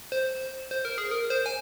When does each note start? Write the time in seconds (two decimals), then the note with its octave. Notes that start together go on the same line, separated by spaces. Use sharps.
0.12 C5
0.71 C5
0.85 A#4
0.98 G#4
1.11 A#4
1.30 C5
1.46 G#5